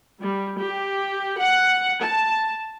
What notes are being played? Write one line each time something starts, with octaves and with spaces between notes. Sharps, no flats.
G3
G4
F#5
A5